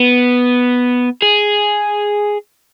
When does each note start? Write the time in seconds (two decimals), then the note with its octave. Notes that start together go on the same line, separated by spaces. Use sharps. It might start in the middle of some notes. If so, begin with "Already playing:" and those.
Already playing: B3
1.22 G#4